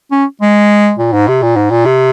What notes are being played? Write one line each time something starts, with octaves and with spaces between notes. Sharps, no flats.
C#4
G#3
A#2
G#2
C3
A#2
G#2
A#2
C3